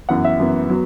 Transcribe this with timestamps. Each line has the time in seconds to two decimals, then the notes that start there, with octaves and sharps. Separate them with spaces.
0.09 F#2 E3 B3 F#5
0.24 E5
0.40 F#2 E3 B3
0.70 F#3 B3